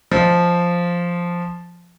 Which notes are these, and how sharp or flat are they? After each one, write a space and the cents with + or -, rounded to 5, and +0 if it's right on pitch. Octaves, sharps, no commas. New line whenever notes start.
F3 +0 D#5 +0